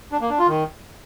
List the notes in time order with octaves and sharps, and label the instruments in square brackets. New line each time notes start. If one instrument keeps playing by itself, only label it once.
[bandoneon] D4
A#3
D4
F4
D#3